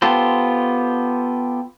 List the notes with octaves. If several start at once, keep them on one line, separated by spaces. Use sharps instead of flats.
B3 F4 G4 A4 C5